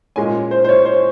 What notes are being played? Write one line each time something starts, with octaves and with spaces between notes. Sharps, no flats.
A#2 G#3 C#4 G#5
C5
C5
C#5
C5